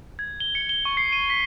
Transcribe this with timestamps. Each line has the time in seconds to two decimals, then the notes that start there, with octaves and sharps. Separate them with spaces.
0.19 G#6
0.40 G7
0.55 C#7
0.69 G7
0.85 C#6
0.97 C7
1.12 D#7
1.30 B6